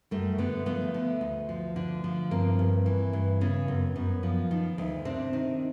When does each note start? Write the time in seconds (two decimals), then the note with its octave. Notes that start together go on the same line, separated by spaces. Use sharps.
0.11 F#2 G3 A3
0.38 D3 A3 B3
0.66 F3 A3 B3
0.94 D3
1.21 D2
1.49 F3
1.76 D3
2.04 F3
2.31 G2 A#3 C4
2.59 G2
2.86 E3
3.13 G2
3.41 C#3 B3 C#4
3.68 F#2
3.96 F#2 B3 C#4
4.23 F3
4.51 D#3
4.78 D2
5.05 C3 C4 D4
5.33 D#3